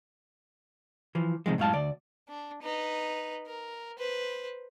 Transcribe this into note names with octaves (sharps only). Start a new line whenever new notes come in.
E3 F3
C3 D#3 F3 G#3
F#2 A2 G#3 F5 A5
D2 D5
D4
D#4 B4
A#4
B4 C5